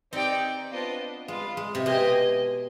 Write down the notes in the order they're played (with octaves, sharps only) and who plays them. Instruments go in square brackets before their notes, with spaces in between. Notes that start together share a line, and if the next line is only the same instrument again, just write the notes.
[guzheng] C4 [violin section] D#4 G4 D5 G5
[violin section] B3 D4 F4 C5 D#5
[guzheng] G#3 [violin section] F4 B4 F5
[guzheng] G#3
C3
[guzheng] B2 [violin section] G4 C5 D#5 G#5